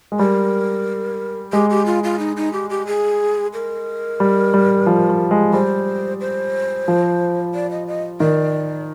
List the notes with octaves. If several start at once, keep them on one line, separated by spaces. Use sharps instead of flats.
G#3
G3 A#4
G#3 G4
G4
F4
F4
D#4
D#4
G4
G4
G#4
A#4
G3
G3
F3
G3
G#3
G3 C5
C5
F3
D5
D#5
D#5
D#3 D5